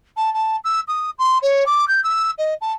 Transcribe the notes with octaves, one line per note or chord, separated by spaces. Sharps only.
A5
A5
E6
D#6
C6
C#5
D6
G6
E6
D#5
A5